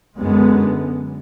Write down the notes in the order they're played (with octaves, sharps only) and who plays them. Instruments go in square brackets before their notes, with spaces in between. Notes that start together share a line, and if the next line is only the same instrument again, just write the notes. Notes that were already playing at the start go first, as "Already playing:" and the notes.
[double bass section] F#2 D3 G#3 B3